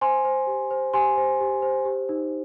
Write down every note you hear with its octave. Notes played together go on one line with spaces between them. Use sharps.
C5 G#5 C6
C5
G4
C5
G4 G#5 C6
C5
G4
C5
G4
D#4